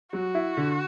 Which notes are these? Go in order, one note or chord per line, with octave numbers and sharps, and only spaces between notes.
F#3 F#4
E4
D3